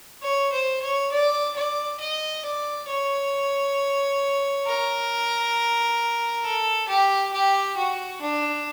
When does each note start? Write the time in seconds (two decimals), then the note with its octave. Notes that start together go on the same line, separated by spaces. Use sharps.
0.22 C#5
0.52 C5
0.82 C#5
1.11 D5
1.56 D5
2.00 D#5
2.44 D5
2.88 C#5
4.66 A#4
6.44 A4
6.88 G4
7.33 G4
7.77 F#4
8.21 D4